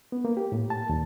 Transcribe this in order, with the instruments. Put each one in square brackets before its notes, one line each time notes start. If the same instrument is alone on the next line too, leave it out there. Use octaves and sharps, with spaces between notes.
[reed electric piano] B3
A#3
G4
A2
A5
D#2